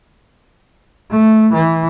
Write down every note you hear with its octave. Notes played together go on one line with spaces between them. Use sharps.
A3
E3